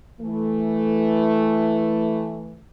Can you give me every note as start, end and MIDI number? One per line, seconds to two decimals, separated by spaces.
0.21 2.61 52
0.21 2.61 57